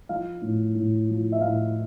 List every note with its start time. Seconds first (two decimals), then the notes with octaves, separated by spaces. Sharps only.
0.09 F3 F5
0.42 A2
0.75 A2
1.09 F3
1.32 E5
1.41 A2 F5